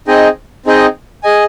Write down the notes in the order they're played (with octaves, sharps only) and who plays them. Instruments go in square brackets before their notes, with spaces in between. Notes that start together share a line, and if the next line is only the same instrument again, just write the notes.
[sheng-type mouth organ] C4 D#4 G#4 D#5 G5
C4 D#4 G#4 D#5 G5
G#4 D#5 G#5